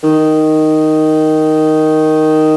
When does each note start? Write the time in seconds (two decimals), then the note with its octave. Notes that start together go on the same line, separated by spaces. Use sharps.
0.03 D#3